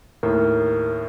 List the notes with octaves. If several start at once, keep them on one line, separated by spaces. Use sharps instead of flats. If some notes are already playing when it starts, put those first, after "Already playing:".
D#2 A2 A#4